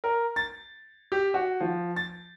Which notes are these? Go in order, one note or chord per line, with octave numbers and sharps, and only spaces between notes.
A#4
A6
G4
F#4
F3
A6